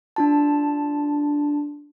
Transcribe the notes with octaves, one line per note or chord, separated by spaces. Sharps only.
D4 F4 A5